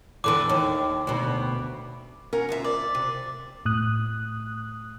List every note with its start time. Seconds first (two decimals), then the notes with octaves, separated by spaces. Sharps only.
0.24 E2 D3 E3 D6
0.49 D#2
1.07 D2 B2
2.33 C#4 A#4 F#5
2.49 D2 F4 E5
2.64 D5
2.95 C3
3.66 A2 D#6 F#6